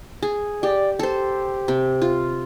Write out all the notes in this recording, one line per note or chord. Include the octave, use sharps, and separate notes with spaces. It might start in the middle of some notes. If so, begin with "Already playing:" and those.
G#4
G4 D5
G4 A4 C5
C3
F4